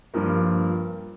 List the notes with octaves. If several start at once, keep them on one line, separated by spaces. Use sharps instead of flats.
G2 F3 A#3